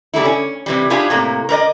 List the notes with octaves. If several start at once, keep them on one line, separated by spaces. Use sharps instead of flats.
C#3 G3 A3 E4
C#4
C3 E3 G3
C#4 D4 E4 F4 G4 G#4
A2 C3 A#3
A#4 B4 D5 D#5